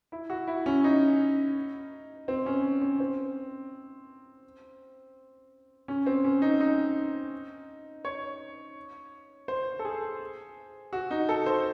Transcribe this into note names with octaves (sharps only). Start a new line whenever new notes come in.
E4
F#4
E4
C#4
D#4
C4
C#4
C#4
C4
C#4
C4
C#4
D#4
D#4
C#5
C5
A4
G#4
F#4
D#4
A4
C5